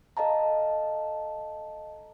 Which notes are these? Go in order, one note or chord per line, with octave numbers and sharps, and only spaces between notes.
A4 D#5 F5 A5 A#5